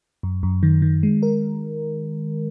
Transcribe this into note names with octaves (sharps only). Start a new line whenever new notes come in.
F#2
F#2
D#3
D#3
G#3
A#4